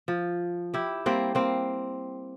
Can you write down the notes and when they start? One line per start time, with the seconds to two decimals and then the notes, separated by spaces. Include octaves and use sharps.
0.08 F3
0.74 E4 G4
1.06 G3 A#3 C4
1.35 A#3 C4